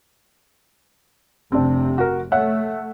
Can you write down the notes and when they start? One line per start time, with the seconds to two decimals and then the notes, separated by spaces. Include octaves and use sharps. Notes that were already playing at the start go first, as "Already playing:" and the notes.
1.52 F1 C3 C4 D4
1.98 F#4 A#4
2.32 A3 C#5 E5 F#5